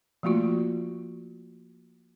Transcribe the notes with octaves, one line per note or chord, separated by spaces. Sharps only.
F3 A3 A#3 F4 F#4